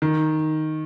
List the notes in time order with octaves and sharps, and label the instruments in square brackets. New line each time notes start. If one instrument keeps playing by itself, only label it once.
[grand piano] D#3